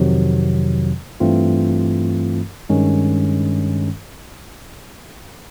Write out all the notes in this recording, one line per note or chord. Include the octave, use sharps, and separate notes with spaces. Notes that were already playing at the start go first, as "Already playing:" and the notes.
Already playing: F2 C3 D#3 F#3
G2 E3 A3 C4 F4
G2 D#3 G#3 C#4